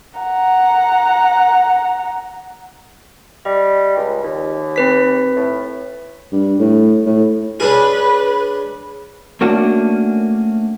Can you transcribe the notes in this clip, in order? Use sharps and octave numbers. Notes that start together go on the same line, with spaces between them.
F#5 A#5
G3 D#5
C#2
D#2
C4 B4 B6
A2
G2
A2
A2
C#4 D4 G#4 B4
A3 A#3 C#4 D4 F#4